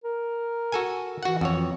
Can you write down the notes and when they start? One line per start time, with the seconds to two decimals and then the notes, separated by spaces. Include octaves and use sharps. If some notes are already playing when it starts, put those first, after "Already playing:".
0.04 A#4
0.72 F#4 A4 G#5
1.23 E3 F#4 F#5
1.41 F2 C#5